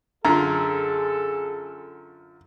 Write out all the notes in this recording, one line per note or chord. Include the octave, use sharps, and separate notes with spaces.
F#2 D3 F4 G#4 A4 A#5